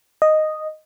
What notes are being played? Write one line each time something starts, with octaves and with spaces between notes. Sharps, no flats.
D#5